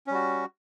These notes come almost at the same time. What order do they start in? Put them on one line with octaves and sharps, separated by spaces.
C#4 G3 F#4